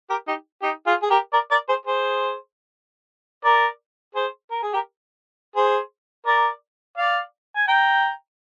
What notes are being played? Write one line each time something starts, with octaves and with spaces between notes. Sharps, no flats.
G4 A#4
D#4 G4
D#4 G4
F4 G#4
G#4
G4 A#4
A#4 D5
A#4 D5
G#4 C5
G#4 C5
A#4 D5
G#4 C5
A#4
G#4
G4 A#4
G#4 C5
A#4 D5
D5 F5
G#5
G5 A#5